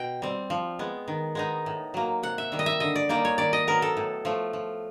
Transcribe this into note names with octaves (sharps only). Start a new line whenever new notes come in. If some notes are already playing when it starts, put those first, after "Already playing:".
Already playing: B2 G5
G3 C4
F3
G#3 B3
D#3
G#3 B3 D#4
A2
F#3 A#3
C3 F#5
E5
D#3 G3
D#5
E5
D3 D#5
D5
G3 A#3 D#4 D5
C#5
D#3 D5
D#5
F#3 B3 A#4
A4
A2
F3 A3
F3